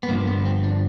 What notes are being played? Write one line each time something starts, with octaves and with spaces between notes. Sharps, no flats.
B3
G2 D3 F3 A#3
B3
C4
D4